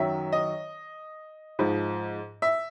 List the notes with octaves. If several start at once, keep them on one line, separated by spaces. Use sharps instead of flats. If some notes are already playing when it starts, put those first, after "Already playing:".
Already playing: F#2 D#3 F#3 E5
D#5
G#2 F3
E5